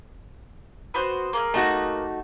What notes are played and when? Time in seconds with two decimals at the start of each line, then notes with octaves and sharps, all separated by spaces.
0.94 B3 F#4 C5
1.33 A#3 G#4 F6
1.54 A3 D#4 F#4